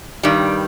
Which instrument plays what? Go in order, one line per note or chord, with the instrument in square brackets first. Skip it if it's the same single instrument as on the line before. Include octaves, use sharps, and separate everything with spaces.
[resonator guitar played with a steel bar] G2 D#3 G3